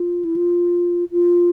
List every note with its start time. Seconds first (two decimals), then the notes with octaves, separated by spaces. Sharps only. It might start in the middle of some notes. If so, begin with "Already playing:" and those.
Already playing: F4
0.25 E4
0.36 F4
1.12 F4